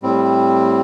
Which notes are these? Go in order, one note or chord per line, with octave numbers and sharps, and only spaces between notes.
A2 G3 C4